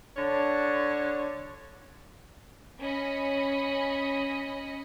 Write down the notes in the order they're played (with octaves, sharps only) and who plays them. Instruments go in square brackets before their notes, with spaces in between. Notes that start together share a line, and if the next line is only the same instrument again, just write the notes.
[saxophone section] D3 D4 C#5
[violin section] C#4 D#5 B5